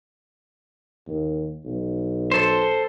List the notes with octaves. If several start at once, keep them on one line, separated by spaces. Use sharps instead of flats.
D#2
B1
A4 C5